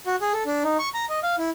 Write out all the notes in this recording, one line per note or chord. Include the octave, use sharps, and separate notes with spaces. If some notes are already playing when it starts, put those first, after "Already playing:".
F#4
G#4
A4
D4
D#4
C#6
A#5
D#5
F5
E4